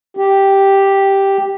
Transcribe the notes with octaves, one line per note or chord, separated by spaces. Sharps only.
G4